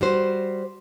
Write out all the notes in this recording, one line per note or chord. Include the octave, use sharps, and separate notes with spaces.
G3 F#4 C5